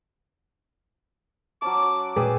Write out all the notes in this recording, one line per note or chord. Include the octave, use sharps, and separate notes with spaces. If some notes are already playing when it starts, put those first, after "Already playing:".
F#3 C#4 A5 D6
A#2 G#3 G#4 B4 D5 G5 D#6 E6